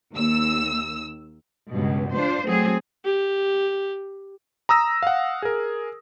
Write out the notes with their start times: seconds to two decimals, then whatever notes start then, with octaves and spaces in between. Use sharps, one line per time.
0.14 D#2 E6
1.72 C#2 G2 B2
2.15 D4 F4 C5
2.47 F#3 A3 C4 G#4
3.05 G4
4.69 A#5 D#6 E6 A#6
5.02 F5 F#5
5.42 G#4 A#4